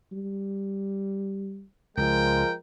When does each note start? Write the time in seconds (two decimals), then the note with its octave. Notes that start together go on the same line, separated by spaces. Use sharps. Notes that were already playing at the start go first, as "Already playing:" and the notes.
0.12 G3
1.97 C#2 F3 G#3 A#4 G5